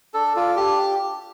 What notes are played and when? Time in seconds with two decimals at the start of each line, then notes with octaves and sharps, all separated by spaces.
0.14 D4 A4
0.36 F4 A4 D5
0.56 D4 G4